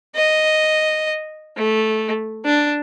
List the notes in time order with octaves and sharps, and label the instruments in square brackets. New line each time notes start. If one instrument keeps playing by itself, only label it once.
[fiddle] D#5
A3
D4